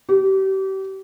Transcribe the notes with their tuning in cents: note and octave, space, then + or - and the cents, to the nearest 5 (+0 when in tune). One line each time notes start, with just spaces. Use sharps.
G4 -35